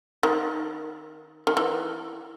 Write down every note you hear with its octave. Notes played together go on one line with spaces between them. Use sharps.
D#3
D#3
E3